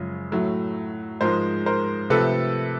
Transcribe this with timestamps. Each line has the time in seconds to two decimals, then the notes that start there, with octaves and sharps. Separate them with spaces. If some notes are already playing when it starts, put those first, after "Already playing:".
Already playing: F#2 C#3 F3 G#3
0.32 A2 F#3 A3
1.21 G#2 F3 G#3 A#4 C5
1.66 A#4 C5
2.10 C3 F3 A3 A4 B4